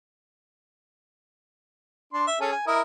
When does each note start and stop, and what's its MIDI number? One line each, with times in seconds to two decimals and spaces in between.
2.13 2.26 62
2.13 2.26 84
2.27 2.36 76
2.41 2.52 61
2.41 2.52 68
2.41 2.52 69
2.52 2.62 80
2.67 2.81 64
2.67 2.81 70
2.67 2.81 75